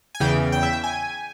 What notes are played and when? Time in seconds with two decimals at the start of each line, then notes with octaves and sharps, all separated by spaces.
0.15 G#5
0.20 E2 C#3 E3 G5
0.52 G5
0.63 E5
0.73 G5
0.84 G#5